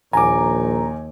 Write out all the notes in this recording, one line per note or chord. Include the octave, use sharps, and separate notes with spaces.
A#1 D#2 G#5 A#5 D6